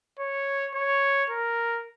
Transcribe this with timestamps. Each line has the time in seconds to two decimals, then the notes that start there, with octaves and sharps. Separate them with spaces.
0.19 C#5
0.75 C#5
1.30 A#4